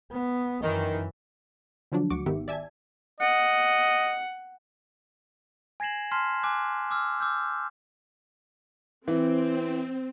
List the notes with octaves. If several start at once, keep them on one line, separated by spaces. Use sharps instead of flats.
B3
F#2 D#3 E3
D3 F3 F#3 D4
D2 F#4 C#6 D6 C#7
G#1 D#3 B3 G4 E5
D5 E5 G#5 A5 G#6
D#5 F#5
G#5 G#6 A#6 C7 E7 F#7
A5 C6 F6 B6 C7 E7
G#5 D6 F#6
D6 E6 F6
D6 E6 F6 G6
E3 C4